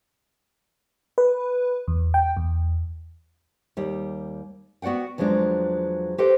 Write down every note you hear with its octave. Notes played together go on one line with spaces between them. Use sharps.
B4
E2
G5
E2
D#2 G3
B3 F#4 D5 F#5 G5
E2 F3 F#3 G#3 D4
G4 A4 B4 C5 D#5 G5